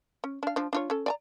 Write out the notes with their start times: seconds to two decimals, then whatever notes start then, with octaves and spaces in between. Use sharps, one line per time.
0.24 C#4
0.43 D4 F5
0.56 F3 D4
0.73 D4 F4 C#5
0.90 C#4 A4
1.06 D5 G#5 A#5